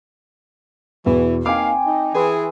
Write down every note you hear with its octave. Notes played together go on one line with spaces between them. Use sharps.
E2 B2 E3 C#6
A#3 C4 D#4 F5 G5 G#5 D6
D#4
E3 E4 G#4 B4 C6 E6